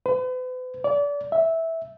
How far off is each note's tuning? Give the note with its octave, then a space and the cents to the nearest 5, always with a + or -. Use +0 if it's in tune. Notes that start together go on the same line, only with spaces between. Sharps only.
B4 +45
D5 -30
E5 -10